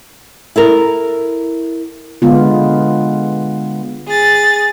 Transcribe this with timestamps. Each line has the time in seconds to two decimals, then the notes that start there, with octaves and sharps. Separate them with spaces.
0.56 E4 A4 A#4
2.22 D3 G#3 B3 F4
4.07 G#4 A6